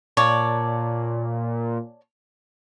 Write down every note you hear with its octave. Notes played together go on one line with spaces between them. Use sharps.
A#2 C#5 D5 A5